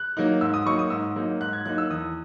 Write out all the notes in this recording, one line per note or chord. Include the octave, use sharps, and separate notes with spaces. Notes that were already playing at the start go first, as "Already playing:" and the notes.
Already playing: F#6
F#3 A#3 D#4
G#2 E6
D#6
F#3 A#3 D#4 C#6
D#6
G#2 E6
F#3 A#3 D#4
G#2 F#6
G#6
F#3 A#3 D#4 F#6
E6
E2 D#6